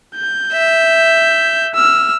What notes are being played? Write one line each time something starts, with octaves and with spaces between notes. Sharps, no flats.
G6
E5
E6 F6